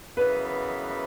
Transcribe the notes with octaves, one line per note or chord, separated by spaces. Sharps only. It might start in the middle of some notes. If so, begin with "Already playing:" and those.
F#2 C#3 E3 B3 B4